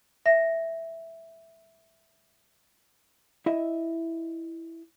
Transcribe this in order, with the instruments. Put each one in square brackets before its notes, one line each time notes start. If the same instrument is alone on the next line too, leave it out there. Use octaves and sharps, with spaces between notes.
[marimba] E5 A#6
[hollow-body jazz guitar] E4 D#5 E5